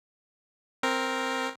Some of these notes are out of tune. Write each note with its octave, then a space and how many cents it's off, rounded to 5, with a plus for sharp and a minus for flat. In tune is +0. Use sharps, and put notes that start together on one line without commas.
C4 +5 A#4 +0